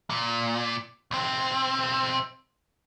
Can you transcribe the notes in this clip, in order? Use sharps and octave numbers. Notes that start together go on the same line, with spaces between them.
A#2
B1 C4